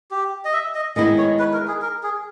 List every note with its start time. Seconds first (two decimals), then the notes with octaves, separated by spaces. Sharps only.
0.11 G4
0.45 D#5
0.53 E5
0.75 D#5
0.96 D#3 G#3 B3 E4 D#5
1.18 C#5
1.39 B4
1.53 A#4
1.68 G#4
1.82 A#4
2.03 G#4